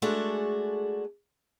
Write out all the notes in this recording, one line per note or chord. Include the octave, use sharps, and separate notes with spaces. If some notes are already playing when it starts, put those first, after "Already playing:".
G#3 A3 D4 F#4 G#4 A4